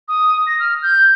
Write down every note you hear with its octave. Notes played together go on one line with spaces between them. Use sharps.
D#6
A#6
F6
G6